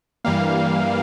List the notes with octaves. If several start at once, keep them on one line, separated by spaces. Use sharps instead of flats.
G2 E3 G3 A#3 F5